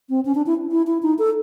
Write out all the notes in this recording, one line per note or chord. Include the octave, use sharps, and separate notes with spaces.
C4
C#4
D4
E4
E4
E4
D#4
A4